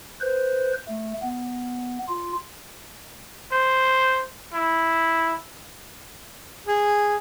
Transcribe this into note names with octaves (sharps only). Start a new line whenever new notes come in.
B4 C5
A3
B3
F4
C5
E4
G#4